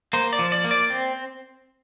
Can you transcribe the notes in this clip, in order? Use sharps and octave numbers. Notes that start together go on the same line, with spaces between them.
A#3 C5
D5
F3
D5
A#3
D5
C4